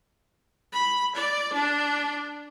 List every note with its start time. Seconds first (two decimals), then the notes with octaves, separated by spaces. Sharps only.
0.73 B5
1.15 D5
1.53 D4